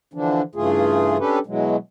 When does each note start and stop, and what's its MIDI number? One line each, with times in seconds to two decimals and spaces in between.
0.14 0.42 50
0.14 0.42 52
0.14 0.42 53
0.14 0.42 62
0.55 1.17 43
0.55 1.17 49
0.55 1.17 52
0.55 1.17 57
0.55 1.17 65
0.55 1.17 68
1.19 1.39 61
1.19 1.39 62
1.19 1.39 67
1.19 1.39 69
1.19 1.39 71
1.47 1.76 47
1.47 1.76 52
1.47 1.76 54
1.47 1.76 56